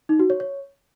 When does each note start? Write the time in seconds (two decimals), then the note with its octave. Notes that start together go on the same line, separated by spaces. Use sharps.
0.09 D#4
0.19 F#4
0.30 C#5
0.40 C#5